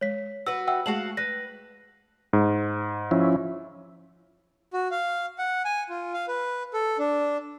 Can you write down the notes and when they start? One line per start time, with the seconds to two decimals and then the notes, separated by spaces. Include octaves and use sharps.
0.01 G#3 C#5 B6
0.47 F#4 B4 E6
0.67 E5 F#5 G5 E6
0.86 G#3 A3 F#4 G#4 F5 A5 F#7
1.17 B4 A#6
2.33 G#2
3.11 F3 C#4 E4
4.73 F#4
4.91 F5
5.39 F#5
5.65 G#5
5.89 F4
6.14 F5
6.28 B4
6.74 A4
6.98 D4